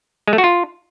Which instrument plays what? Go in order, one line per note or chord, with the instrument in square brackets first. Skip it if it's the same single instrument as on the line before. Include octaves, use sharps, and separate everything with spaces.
[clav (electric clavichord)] G#3
A3
F#4
F4